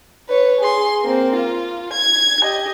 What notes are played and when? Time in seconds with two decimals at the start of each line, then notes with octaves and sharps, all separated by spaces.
0.29 B4 C#5
0.61 G#4 C6
1.03 A#3 C4
1.36 F4
1.93 G#6
2.41 G4 D#5